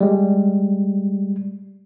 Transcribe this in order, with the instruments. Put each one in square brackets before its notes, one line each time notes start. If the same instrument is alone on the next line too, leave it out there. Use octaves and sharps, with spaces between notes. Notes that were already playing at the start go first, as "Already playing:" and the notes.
[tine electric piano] G3 G#3